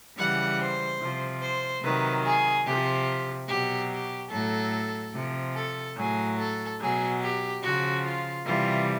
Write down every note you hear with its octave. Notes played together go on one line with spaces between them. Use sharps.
C#3 E3 G3 F#5
C5
C3 F3
C5
C3 D#3 F#3 B4
G#4
C3 F3 G4
B2 F#3 G4
G4
A2 F#3 A4
C3 F3
A4
A2 F#3 G#4
A4
B2 F#3 G#4
G4
C#3 F3 F#4
F4
C3 E3 G3 F4